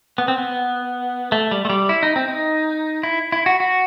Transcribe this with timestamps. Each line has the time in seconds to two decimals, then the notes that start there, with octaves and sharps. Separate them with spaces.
0.18 B3
0.28 C4
0.38 B3
1.32 A3
1.51 G3
1.65 A3
1.70 G3
1.89 E4
2.03 D#4
2.16 C4
2.28 D#4
3.03 E4
3.32 E4
3.46 F#4
3.60 F#4